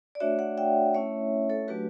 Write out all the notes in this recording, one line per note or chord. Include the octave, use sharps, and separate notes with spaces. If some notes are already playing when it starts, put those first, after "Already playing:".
D5
A3 D4 F#4 C#5 E5
D5 F#5
E5 G5
A3 C#4 E4 C#5 E5
A4 C#5
F#3 A3 D4 F#4 G4 B4